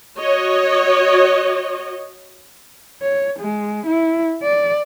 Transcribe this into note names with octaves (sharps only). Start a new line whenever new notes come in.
F#4 C#5 D#5
C#5
G#3
E4
D5